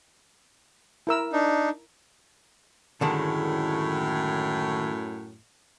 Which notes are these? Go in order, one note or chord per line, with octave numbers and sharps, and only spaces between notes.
E4 A#4 E6
D4 D#4
F#2 A2 D3 D#3 G#3